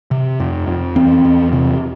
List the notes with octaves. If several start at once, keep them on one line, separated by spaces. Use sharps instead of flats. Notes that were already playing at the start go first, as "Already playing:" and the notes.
C3
F2
F2
E2 C4
E2
C3